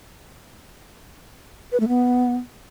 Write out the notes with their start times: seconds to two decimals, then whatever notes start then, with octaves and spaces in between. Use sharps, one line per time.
1.72 B4
1.80 A3
1.88 B3